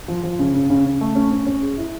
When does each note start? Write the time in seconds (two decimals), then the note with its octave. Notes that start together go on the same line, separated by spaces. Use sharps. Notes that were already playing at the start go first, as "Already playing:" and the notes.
0.08 F3
0.23 F3
0.39 C#3
0.54 C#3
0.70 C#3
0.85 C#3
1.01 A3
1.16 C#4
1.32 C#4
1.47 C#4
1.63 G#4
1.78 E4